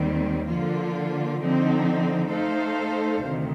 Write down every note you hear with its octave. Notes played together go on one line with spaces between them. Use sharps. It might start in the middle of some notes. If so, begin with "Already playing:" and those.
Already playing: D#2 D#3 G3 C4
D3 F3 A#3 F4
D3 F3 C4 D#4
A3 D#4 A4 C5 F5
D2 C3 D#3